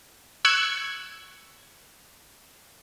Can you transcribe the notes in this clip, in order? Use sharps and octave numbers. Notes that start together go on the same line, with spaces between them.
C#6 E6 F#6 G#6 C#7